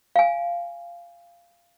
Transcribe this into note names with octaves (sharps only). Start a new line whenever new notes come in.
F5 G#5